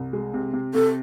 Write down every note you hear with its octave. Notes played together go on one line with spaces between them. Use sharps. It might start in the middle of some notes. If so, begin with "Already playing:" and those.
Already playing: C2
G#3
C3
C3
C3 A4